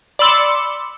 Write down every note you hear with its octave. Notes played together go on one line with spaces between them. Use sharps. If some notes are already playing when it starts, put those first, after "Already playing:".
D5 B5 C6 E6 A6 C#7